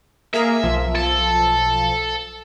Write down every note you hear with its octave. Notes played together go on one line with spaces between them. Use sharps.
A#3 G#4 A#4 E5
B1 F3
A4